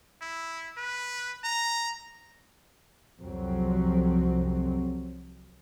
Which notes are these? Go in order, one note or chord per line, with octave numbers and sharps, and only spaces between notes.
E4
B4
A#5
C2 F2 F#3 C4